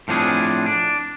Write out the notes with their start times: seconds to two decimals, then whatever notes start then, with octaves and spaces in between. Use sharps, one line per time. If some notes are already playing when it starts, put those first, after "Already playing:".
0.08 A2 F3 C4 D4 G#4
0.66 D4